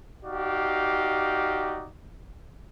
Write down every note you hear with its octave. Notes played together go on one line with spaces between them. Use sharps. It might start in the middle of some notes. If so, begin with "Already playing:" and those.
D#4 F#4 G4 D5 F5